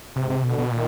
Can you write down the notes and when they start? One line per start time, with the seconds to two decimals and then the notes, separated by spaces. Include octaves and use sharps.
0.16 G#2 C3
0.30 C3
0.43 B2 D3
0.58 B2
0.71 A#2 D#3